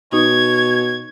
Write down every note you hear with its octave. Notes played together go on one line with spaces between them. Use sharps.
B2 D#4 C#5 G#6